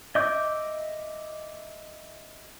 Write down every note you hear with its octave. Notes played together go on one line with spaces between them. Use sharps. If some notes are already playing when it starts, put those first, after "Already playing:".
D#5 E5 D6 G6